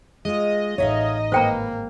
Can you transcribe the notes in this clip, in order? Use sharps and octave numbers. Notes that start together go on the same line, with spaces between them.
G#3 F4 D#5
A1 D#4 C#5 E5 F5
G#1 A#3 B4 C5 G5 A#5